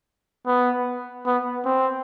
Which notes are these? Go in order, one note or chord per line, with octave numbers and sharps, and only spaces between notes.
B3
B3
C4